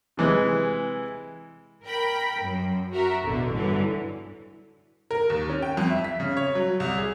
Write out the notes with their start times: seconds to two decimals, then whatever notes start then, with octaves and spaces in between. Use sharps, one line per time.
0.17 C3 E3 G#3 B4
1.84 A#4 G5 B5
2.41 F#2
2.92 F#4 A#4 E5
3.25 A1 E2 B2 D3
3.54 G2 D3 E3 F#3
5.11 A#4
5.30 D#2
5.50 C#4
5.62 G5
5.77 F2
5.90 E5
6.04 B6
6.20 C#3
6.37 C#5
6.55 F#3
6.80 C2
6.98 G#4